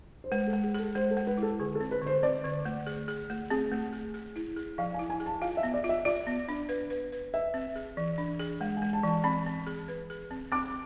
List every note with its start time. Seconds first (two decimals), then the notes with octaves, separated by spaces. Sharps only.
0.24 C5
0.31 G#3 B4
0.47 A4
0.53 G#3
0.63 G#4
0.74 G#4 A4
0.95 G#3 C5
1.11 A4
1.17 G#3
1.27 B4
1.38 E4
1.43 A4
1.59 D3 G#4
1.75 A4
1.80 C4
1.91 B4
2.02 D3 C5
2.23 C4 D5
2.44 D3
2.65 A3
2.87 G#4
3.08 G#4
3.30 A3
3.50 C4 G#4
3.72 A3
3.93 G#4
4.14 G#4
4.36 E4
4.56 G#4
4.78 F3 F5
4.94 G#5
4.99 E4
5.10 G#5
5.20 G#4
5.26 A5
5.42 F4 F5
5.57 E5
5.63 B3
5.74 D5
5.84 F4
5.89 E5
6.05 F4 D5
6.27 B3
6.49 D4
6.69 B4
6.90 B4
7.12 B4
7.34 B4 E5
7.54 C4
7.76 G#4
7.97 E3
8.18 D4
8.40 G#4
8.60 G#3 F5
8.77 G#5
8.82 G#3
8.93 A5
9.03 E3 A5
9.24 C4 B5
9.46 C4
9.67 G#4
9.88 B4
10.10 G#4
10.31 C4
10.52 C4 D6